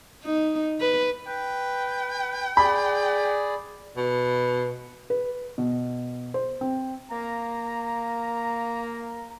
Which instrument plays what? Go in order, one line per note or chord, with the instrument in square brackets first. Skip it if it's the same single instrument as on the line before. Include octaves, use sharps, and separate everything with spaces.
[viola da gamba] D#4
B4
[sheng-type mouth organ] B4 [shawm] G5
[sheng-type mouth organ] G#4 D5 [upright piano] B5
[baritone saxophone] B2
[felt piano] B4
B2
C5
C4
[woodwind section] A#3 A#5